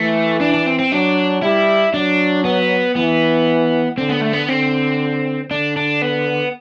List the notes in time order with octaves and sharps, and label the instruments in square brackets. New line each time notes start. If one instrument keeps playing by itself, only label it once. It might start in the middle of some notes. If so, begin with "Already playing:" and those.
Already playing: [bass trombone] E3 [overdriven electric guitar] A3
[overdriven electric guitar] D4
D4
C4
C4
[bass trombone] F#3 [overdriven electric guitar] D4
[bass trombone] G3 [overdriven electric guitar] E4
[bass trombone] F#3 [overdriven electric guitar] D4
[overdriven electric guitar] B3
[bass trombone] E3 [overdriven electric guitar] B3
[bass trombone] D3 [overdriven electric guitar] C4
[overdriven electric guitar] B3
A3
B3
[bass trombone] D3 [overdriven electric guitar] C4
[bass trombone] D3 [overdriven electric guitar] D4
[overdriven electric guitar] D4
B3